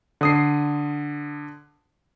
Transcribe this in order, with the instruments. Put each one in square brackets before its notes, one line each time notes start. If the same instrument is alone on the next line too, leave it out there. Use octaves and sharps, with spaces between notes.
[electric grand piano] D3 D#6 C7